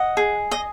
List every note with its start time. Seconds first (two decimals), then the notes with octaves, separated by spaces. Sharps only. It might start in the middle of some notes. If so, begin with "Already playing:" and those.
Already playing: D#5 F#5
0.17 G#4
0.51 D#5